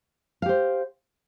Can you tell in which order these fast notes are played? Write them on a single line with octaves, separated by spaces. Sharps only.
F5 G4 C5